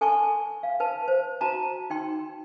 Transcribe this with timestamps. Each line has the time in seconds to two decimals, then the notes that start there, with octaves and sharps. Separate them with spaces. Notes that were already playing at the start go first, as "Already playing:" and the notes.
0.01 A4 G#5 A5 C6 C#6
0.63 F5
0.80 B4 A5
1.08 C5
1.41 F#4 A5 A#5
1.90 D#4 G5 C6